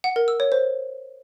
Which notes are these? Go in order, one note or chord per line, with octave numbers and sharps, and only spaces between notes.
F#5
A#4
E6
C#5
C5